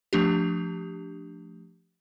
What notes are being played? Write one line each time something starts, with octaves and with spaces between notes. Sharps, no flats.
F3 A3 D4 G4